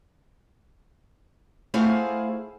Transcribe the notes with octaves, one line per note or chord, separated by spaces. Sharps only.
A3 E4 G#4 C5 F5 F#5